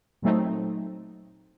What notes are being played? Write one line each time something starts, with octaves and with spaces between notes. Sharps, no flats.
A#2 F#3 A3 C4 D#4